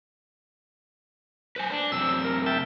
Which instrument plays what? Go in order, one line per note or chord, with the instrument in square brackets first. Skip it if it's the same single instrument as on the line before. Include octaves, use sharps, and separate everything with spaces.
[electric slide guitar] B4 C5 G#5
D4
[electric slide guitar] F#2 C3 C4 [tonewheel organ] E6
[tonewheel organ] A#4
E5 G5 A5